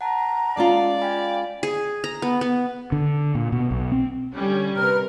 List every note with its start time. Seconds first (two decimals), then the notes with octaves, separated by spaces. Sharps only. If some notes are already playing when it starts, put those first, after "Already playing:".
0.01 F#5 A5 A#5
0.57 G#3 C#4 F4 D5
1.02 F5 G5 G#5 B5
1.63 G#4
2.04 A#5
2.22 B3
2.41 B3
2.92 D3
3.35 A#2
3.52 B2
3.71 B1
3.92 C4
4.35 D3 G3 C#4
4.77 C3 A#4 B4 F6